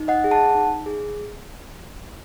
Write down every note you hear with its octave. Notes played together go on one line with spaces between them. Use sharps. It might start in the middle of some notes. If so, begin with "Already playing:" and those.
Already playing: D#4
D#5 F#5
G#4
F#5 A5
D#4
G#4